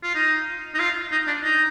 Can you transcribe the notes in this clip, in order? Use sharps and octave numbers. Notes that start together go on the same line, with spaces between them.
F4
D#4
D#4
F4
D#4
D4
D#4